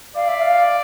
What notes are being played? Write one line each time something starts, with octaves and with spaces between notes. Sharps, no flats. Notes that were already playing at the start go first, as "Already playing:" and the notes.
D5 F5
E5
F5